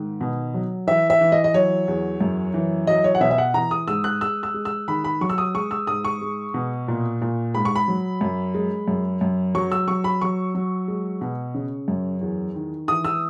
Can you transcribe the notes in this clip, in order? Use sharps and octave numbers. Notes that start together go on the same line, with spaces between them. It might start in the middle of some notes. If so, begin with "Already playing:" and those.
Already playing: G#2 D#3
B2
F#3
E3 E5
E5
E3
D#5
D#5
F#3 C#5
E2
F#2
E3
F#3 D#5
C#5
F#5
B2 E5
E5
F#5
E3 A#5
D#6
G#2 E6
F#6
G#3 E6
E6
G#3
E6
D#3 B5
B5
F#3 C#6
E6
D#6
G#3 C#6
E6
G#2 D#6
C#6
G#3
B2
A#2
A#2
G#2 B5
C#6
B5
F#3
F#2
G#3
F#2
F#2
F#3 C#6
E6
F#3 C#6
B5
F#3 C#6
F#3
G#3
B2
C#3
F#2
E2
D#3
E3 D#6
E6